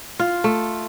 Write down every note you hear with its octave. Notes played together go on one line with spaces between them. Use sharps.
F4
A3